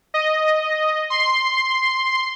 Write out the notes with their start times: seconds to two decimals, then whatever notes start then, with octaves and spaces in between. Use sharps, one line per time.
0.14 D#5
1.10 C6 C7